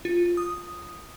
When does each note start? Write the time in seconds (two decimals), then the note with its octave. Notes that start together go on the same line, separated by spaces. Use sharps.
0.05 F4
0.37 D#6